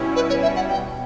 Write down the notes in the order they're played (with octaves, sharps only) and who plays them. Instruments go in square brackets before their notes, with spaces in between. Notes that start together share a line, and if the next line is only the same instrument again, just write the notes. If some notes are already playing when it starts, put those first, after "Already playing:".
Already playing: [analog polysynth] B2 G3 C#4 E4
[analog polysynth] B2 [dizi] B4
[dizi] C#5
[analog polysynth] G3 C#4 E4 [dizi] E5
[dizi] F#5
[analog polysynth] B2 [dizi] G5